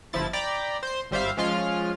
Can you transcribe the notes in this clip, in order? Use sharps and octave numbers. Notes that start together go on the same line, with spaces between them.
G1 F3 E4 A6
D5 G5 A#5 B5
C5 C6
G#1 G3 C5 E5 F5
F3 G#3 C#4 F4 C6 F6